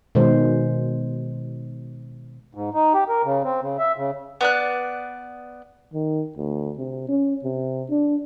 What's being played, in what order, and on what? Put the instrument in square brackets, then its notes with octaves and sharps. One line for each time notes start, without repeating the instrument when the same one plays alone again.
[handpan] B2 D#3 G#3 C5
[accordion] G#2
D#4
G4
A#4
C#3
C4
C#3
E5
C#3
[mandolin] B3 D5 F#6
[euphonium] D#3
D2
C3
C#4
C3
D4